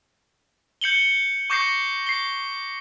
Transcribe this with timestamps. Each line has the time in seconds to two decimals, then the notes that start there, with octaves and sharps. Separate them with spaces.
0.81 G6 C#7 F#7 G7
1.50 C#6 D6 G6 A#6 C7 C#7
2.07 C7 G7